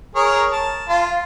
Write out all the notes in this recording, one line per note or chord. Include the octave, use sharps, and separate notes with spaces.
G#4 A#4 C#5
A5
F4